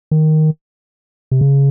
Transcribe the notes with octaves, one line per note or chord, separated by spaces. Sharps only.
D#3
C3
C#3